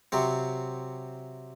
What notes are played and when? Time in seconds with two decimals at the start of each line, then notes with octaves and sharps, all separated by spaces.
0.12 C3 F#3 C4